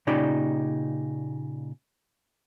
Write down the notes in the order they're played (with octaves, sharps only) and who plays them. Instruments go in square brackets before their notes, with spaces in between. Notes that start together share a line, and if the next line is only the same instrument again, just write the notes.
[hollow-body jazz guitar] A#2 C#3 D#4 G4 D5 B5